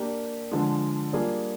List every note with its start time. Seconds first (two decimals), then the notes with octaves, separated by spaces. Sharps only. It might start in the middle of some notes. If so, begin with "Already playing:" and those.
Already playing: A#3 D4 G4
0.51 D3 F3 G#3
1.13 G3 A#3 D4 F4 G#4